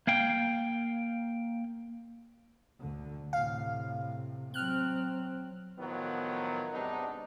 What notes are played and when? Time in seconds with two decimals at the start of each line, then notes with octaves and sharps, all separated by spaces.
0.07 A#3 F5 G5
2.79 D2 D3
3.33 A2 C3 F5
4.54 F#3 C4 F6 F#6
5.78 A2 D#3 F3 F#3 B3
6.72 G#2 C3 B3 D4 D#4